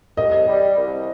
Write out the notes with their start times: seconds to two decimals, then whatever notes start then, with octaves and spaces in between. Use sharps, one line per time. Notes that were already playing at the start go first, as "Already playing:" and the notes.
0.17 C2 D#5
0.48 G3
0.77 C2